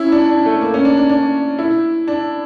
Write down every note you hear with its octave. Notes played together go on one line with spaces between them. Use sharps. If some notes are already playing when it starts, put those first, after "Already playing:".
Already playing: C#4 E4
D4
D4
A3
A#3
C#4
D4
D4
D4
E4
D4